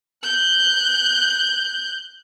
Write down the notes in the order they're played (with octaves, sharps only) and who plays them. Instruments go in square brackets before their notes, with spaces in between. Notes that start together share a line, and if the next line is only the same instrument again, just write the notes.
[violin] F#6 G6